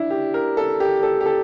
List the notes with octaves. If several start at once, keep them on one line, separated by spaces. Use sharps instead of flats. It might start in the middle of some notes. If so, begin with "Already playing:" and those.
Already playing: D4 E4
G4
A#4
A4
G4
A4
G4
A4